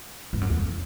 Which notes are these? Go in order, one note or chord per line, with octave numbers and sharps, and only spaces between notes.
G2
F#2
E2